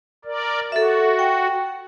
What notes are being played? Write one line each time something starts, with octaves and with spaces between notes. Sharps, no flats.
A#4 D5
F#4 A4 E5
G5